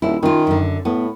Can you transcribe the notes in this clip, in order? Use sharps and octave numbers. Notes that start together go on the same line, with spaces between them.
D#1 E4
D#3 C#4 F4
F#2 D3
A2 B3